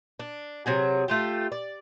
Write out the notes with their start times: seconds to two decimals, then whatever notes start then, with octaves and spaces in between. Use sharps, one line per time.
0.20 D4
0.66 C3 F#3 G#4
1.08 A3 F4 G4
1.52 D5